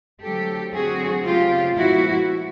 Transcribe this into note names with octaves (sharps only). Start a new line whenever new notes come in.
D3 F#3 A3 C4 G4 A4
D3 F#3 A3 C4 F#4 G#4
C#3 F#3 A3 C4 F4 G4
A#2 F3 G#3 B3 E4 F#4